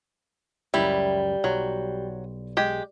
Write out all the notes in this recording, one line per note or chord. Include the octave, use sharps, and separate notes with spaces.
C#2 F#2 G3 E4
B1 F#3
G#3 G4